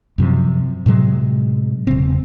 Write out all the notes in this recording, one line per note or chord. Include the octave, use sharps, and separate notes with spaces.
F#2 C3 F3
A2 C3 F#3 G#3
E1 C#3 C4